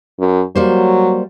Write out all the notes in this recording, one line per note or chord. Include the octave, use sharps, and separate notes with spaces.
F#2
F#3 G3 A#3 C5